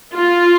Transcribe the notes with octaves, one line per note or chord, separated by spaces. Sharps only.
F4